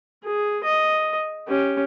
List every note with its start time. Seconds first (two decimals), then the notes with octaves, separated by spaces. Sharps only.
0.24 G#4
0.64 D#5
1.48 C#4 G4